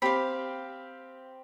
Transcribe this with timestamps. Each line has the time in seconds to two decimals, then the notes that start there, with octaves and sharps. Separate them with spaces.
0.02 C4 G4 F5 B5